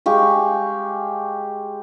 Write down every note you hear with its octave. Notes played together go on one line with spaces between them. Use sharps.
G#3 G4 F5 C#6